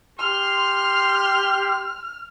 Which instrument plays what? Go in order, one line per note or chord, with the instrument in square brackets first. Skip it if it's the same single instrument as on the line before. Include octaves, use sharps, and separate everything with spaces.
[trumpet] G4 [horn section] C6 [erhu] F6